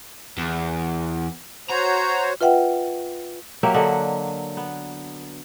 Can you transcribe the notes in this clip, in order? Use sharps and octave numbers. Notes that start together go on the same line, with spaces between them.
E2
F#4 C5 C#5 A#5
F4 B4 E5 F#5 G5
F#3 A#3 G4 E5
D3 D#5 E5 F#5
B3